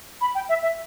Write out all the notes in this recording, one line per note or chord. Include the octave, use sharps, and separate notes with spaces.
B5
G5
E5
E5